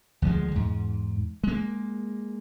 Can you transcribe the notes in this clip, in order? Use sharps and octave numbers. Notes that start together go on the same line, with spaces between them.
D2 F3 G3 G#3
E2 G#2
G#3 A#3